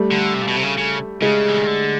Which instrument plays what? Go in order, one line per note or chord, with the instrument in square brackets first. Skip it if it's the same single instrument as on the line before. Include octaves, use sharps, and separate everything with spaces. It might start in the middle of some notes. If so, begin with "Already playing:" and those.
Already playing: [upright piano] G3 A3
[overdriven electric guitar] D3
C3
A#2
B2
C3
C#3
C#3
[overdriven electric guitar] C#3 [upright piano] G#3
[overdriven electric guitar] E3
D#3
D3